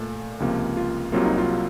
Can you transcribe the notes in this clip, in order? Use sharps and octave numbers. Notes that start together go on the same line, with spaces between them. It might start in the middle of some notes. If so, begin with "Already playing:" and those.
Already playing: A#2 A3 A4
C#2 C3 F3 A#3
F4
C2 C3 F#3 A#3 F4
D#4
F4